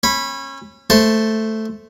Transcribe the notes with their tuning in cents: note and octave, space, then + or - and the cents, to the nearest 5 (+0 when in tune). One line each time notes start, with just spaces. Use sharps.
C#4 -30 B5 -5
A3 +0 C5 +0 A5 +0